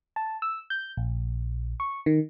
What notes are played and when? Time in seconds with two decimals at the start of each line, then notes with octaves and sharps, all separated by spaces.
0.16 A5
0.42 E6
0.70 G6
0.97 A#1
1.80 C#6
2.06 D#3